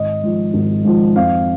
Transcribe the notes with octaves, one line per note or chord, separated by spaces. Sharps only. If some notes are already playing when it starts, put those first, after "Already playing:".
Already playing: G#1 D#5
G#2 F3
G#1
G#2 F3
F2 F5